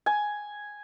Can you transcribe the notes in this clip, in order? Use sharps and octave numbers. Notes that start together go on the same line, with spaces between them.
G#5